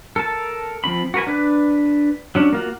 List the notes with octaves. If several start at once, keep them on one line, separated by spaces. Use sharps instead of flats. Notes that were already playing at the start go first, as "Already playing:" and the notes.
A4 A#4 A5
F3 C4 B5
F#4 A#4 B4 G#5
D4 B4
F#3 C#4 D4
A#3 F4 F#4